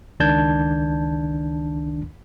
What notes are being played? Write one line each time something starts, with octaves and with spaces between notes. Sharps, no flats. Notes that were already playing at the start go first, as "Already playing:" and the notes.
C#2 D#3 D4 A5 G6 G#6